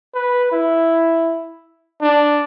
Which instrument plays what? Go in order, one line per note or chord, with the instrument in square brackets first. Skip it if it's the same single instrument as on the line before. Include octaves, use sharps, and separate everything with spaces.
[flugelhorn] B4
E4
D4